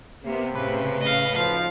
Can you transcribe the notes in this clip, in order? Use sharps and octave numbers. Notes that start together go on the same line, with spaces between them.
C3 A#3 B3
A2 C#3 B4
D#5 F5
B1 F3 F5